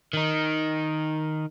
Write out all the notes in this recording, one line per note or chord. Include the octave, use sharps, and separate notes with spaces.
D#3 D#4